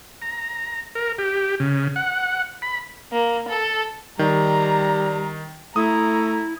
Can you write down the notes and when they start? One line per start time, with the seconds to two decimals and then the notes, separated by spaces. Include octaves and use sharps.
0.22 A#5
0.95 A#4
1.18 G4
1.60 C#3
1.96 F#5
2.62 B5
3.12 A#3
3.48 A4
4.19 D#3 G3 A#5
5.76 A3 E4 A#5 D#6